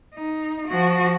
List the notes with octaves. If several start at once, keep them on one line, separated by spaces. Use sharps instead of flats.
D#4
F3 F#4